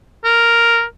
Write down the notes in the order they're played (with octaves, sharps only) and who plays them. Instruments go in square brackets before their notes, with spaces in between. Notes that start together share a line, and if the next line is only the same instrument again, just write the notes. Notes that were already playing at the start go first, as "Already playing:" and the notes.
[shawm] A#4